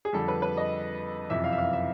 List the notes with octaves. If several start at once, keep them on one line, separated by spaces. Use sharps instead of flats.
G#4
F2 D3 G3 A4
B4
B4
D#5
F#1 F2 C3 E3 E5
F5
E5
F5
E5